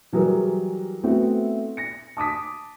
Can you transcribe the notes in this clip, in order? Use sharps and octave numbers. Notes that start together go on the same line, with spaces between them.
E3 F#3 G3 G#4 A#4
A3 B3 C4 E4 F#4
A#6 C#7
A5 D6 D#6 B6